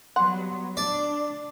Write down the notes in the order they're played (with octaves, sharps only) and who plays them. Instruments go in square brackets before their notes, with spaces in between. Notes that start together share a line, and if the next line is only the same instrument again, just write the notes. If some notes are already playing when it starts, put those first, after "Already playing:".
[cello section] F#3 G3 B3 [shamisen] F#5 [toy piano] C6
[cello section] D4 [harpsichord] D5